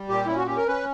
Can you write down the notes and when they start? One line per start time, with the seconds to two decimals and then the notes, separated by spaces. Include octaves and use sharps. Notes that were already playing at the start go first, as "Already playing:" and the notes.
Already playing: G3
0.09 A#2 G4
0.26 C#4 E4
0.37 F#4
0.47 C#4 G4
0.57 A#4
0.68 C#4 B4